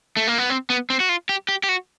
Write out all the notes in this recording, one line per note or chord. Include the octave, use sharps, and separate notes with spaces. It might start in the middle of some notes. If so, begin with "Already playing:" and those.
A3
A#3
B3
C4
B3
C4
F#4
F4
G4
G4
G4
F#4